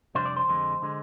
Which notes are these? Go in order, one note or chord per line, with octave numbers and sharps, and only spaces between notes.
F2 C3 G3 D4 C5
D5
C5
F2 D3 G#3
D3 G#3